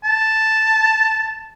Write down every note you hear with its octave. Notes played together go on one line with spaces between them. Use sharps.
A5